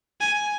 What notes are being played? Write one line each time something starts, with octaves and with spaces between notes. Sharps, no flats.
G#5